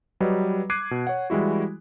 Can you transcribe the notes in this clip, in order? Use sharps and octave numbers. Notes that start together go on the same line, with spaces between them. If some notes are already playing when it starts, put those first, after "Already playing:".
F#3 G3 B4 D#5
D6 F#6 G#6 C7 D7 D#7
B2
C#5 F#5
E3 G3 G#3 E4 F#4